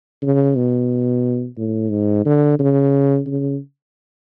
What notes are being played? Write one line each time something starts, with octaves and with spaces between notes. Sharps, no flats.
C#3
B2
A2
G#2
D3
C#3
C#3